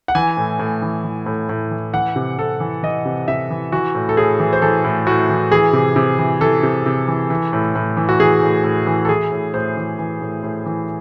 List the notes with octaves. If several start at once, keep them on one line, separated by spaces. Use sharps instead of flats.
F#5
E3 G#5
A2
A2
E3
E3
A2
A2
E3
E3 F#5
C3
C3 A4
E3
E3 D#5
C3
C3 E5
E3
E3 F#4
A2
A4
A2 G#4
E3
C5
E3 A4
A2
A2 F#4
E3
E3 G#4
C3
C3
E3
E3 A4
C3
C3
E3
E3
A2
A2
E3
F#4
E3 G#4
A2
A2
E3
A4
E3 G#4
A2
A2 C5
E3
E3
A2
A2
E3